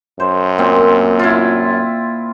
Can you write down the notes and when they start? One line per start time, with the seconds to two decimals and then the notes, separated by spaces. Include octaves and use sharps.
0.20 F#2 C5
0.58 A#2 C4
1.19 E4 F4